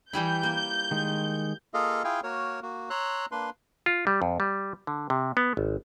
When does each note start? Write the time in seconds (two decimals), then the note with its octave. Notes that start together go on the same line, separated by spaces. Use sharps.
0.13 E3 G3 E4 G6
0.43 A#3
0.91 D#3 G#3
1.74 A#3 F4 G#4 A4 D#5 F5
2.04 E4 F4 G#4 F5 G5 G#5
2.23 A#3 F#4 A#4 C#5
2.62 A#3 F#4
2.90 C#5 A#5 C6 E6 F#6
3.32 A#3 D4 B4 C6
3.86 F4
4.07 G3
4.22 F2
4.40 G3
4.87 D3
5.10 C3
5.37 B3
5.57 G#1